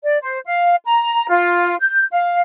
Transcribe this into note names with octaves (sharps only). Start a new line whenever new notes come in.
D5
C5
F5
A#5
F4
G6
F5